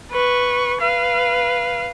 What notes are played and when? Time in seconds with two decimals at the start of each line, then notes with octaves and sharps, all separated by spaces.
0.11 B4 C#6
0.81 B4 F5